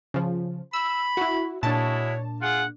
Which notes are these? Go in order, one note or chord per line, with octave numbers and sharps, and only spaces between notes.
C#3 F3
B5 E6
E4 F#4
A#2 G#3 D4 E4 F#4 C#5 A5
F4 G#4 F#5